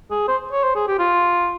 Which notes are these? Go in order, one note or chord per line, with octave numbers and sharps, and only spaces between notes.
G#4
C5
C#5
C5
G#4
G4
F4